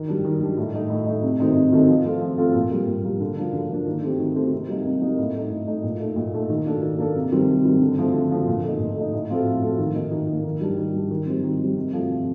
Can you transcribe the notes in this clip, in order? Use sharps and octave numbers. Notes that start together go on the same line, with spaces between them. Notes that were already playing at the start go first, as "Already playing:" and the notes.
Already playing: D#3
G3 D4
D#3
G3 D4
A2
A3 D#4
A2
A3 D#4
C3
D#3 A3 C4 D#4
C3
D#3 A3 C4 D#4
F3
A3 C4 F4 A4
F3
A3 C4 F4 A4
A#2
G3 A#3
A#2
G3 A#3
D3
F3 A#3 D4
D3
F3 A#3 D4
D#3
A3 C4 G4
D#3
A3 C4 G4
C3
G3 A#3 D#4
C3
G3 A#3 D#4
A2
A3 D#4
A2
A3 D#4
A#2
A3 D#4
A#2
A3 D#4
D#3
A#3 D4 A4
D#3
A#3 D4 A4
C3
D#3 G3 C4
C3
D#3 G3 C4
D3
F3 A3 C4
D3
F3 A3 C4
A#2
A3 D#4
A#2
A3 D#4
A2
F3 C4 F4 A4
A2
F3 C4 F4 A4
D#3
A#3 D#4
D#3
A#3 D#4
D#3
G3 D4
D#3
G3 D4
D#3
G3 C4
D#3
G3 C4
C3
F3 A3
C3